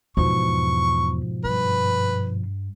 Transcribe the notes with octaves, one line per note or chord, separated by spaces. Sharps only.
E2 G#2 B2 F3 C#6
G2 B4